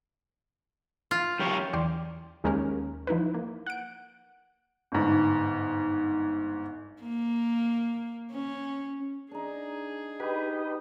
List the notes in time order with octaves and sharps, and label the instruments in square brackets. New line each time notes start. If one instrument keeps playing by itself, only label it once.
[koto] F4
[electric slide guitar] F#2 G4 C#5
[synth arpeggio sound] E2 D5 G5 C6
D#2 G#3 A#3 C#4 G4 A#4
F3 D#4 E4 B4
A#3
F#5 D7
[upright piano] G1 G#2
[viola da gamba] A#3
C#4
[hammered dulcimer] D4 D#4 [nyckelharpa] G#4
[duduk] D#4 [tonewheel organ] G4 B4 [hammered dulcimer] B5